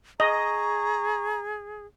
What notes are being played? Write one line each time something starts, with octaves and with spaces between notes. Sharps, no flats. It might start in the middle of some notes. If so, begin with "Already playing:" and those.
G#4 D#5 A#5 C#6